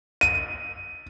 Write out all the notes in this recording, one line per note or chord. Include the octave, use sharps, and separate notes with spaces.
D#7